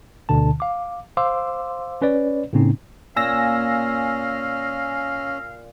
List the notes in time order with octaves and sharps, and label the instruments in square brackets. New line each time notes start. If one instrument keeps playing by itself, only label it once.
[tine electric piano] D2 B2 D3 A5
F5 D6
C5 F5 C6 D6 E6
C#4 B4 C#5 D5
A2 C#3 A#3 C4 C#4 D#4
[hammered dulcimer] A#2 [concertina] C#4 [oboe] F5 [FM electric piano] G#5 E6 A#6